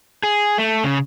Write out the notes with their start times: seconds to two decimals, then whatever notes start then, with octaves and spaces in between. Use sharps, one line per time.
0.23 G#4
0.58 A3
0.84 C#3